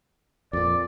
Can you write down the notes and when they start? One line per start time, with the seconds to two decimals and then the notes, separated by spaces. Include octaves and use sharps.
0.53 F2 A#2 D5